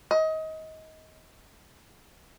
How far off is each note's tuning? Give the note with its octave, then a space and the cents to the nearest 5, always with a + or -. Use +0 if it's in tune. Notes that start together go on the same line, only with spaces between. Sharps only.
D#5 +25